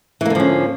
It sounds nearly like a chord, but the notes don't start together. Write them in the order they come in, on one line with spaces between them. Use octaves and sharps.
E3 A#3 D3 F3 C#4